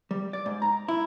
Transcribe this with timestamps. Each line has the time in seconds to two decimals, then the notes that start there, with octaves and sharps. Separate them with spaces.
0.11 G3
0.33 D5
0.46 G#2
0.62 A#5
0.88 E4